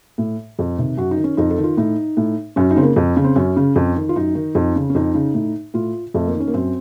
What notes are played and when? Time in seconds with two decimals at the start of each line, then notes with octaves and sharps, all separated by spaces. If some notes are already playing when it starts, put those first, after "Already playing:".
0.18 A2
0.59 F2
0.78 C3 D#3
0.97 F#2 F#4
1.11 D#4
1.17 D#3
1.24 C#4
1.37 F2 D#4
1.50 A4
1.58 D#3
1.63 F4
1.77 A2 D#4
2.17 A2
2.56 F#2 C#4
2.71 D#4
2.76 C#3 C4
2.83 A#3
2.96 F2
3.16 C#3
3.24 C4
3.36 F#2 C#4
3.56 C#3
3.76 F2
3.96 D#3
4.09 F4
4.16 F#2 D#4
4.35 D#3
4.55 F2
4.76 C#3
4.90 C#4
4.95 F2 D#4
5.15 C#3
5.34 A2
5.74 A2 F4
6.14 F2 A3
6.27 A#3
6.34 D#3
6.40 C#4
6.48 A#3
6.54 F#2 C4